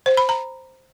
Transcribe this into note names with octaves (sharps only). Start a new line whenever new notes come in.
C5
B5
A#5